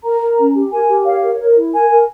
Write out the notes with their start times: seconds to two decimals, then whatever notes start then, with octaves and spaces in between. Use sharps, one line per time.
0.04 A#4 A#5
0.20 A#4
0.38 C#4
0.55 G4
0.71 A#4 G#5
0.88 G4
1.05 C#5 F5
1.22 A#4
1.39 A#4
1.55 E4
1.73 A#4 G#5
1.89 A#4